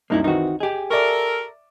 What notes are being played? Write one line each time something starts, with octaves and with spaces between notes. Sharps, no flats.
C2 F#2 A#3 D#4 E4
D#3 E3 C4 D#4 F#4
G4 G#4 D#5 G#5
A4 A#4 D5 E5 C#6